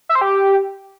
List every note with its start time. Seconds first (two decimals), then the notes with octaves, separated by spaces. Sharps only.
0.09 E5
0.15 C5
0.21 G4